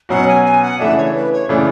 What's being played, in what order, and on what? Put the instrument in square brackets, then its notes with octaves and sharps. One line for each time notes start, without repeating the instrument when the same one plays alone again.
[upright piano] B2 F#3 C#4 F#4 [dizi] F#5
[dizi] G#5
G#5
F#5
[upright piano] C#3 E3 A3 D4 [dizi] E5
[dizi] C#5
B4
C#5
[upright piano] C#3 E3 A3 D4 [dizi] D5